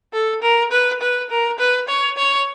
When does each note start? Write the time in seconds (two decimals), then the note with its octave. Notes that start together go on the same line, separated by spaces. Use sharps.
0.13 A4
0.42 A#4
0.71 B4
1.01 B4
1.30 A#4
1.59 B4
1.88 C#5
2.17 C#5